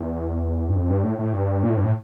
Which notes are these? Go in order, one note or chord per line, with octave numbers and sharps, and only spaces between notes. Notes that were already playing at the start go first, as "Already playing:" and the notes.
Already playing: E2
G2
F2
G2
A2
A2
G2
A#2
A2
G2
A2